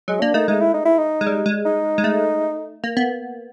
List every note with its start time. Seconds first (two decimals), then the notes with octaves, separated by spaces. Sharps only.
0.08 F#3 G#3
0.21 A#3 D4
0.34 A3 D#4
0.48 G#3 D#4
0.61 E4
0.74 D#4
0.85 E4
0.98 D#4
1.21 G#3
1.27 G3
1.46 G#3
1.65 D#4
1.98 G#3
2.04 A3
2.84 A#3
2.97 B3